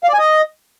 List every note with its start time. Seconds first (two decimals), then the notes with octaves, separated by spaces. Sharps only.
0.04 F5
0.09 D5
0.14 G#5
0.19 D#5